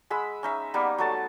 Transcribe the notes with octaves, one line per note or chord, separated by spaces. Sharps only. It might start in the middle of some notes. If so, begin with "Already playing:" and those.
G#3 G#4 B5 E6
C#4 D#4 E5
G3 A#3 B3 D#4
F#3 A3 A5